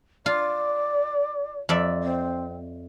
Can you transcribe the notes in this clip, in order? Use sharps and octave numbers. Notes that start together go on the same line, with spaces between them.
F4 D5
F2 D5 E5
C4